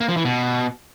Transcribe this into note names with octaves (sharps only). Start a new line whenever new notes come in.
A#3
F3
E3
B2